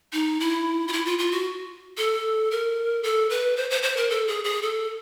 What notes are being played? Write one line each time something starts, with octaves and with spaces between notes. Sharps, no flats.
D#4
E4
F4
E4
F4
F4
F#4
A4
A#4
A4
B4
C5
C5
C5
A#4
A4
G#4
G#4
A4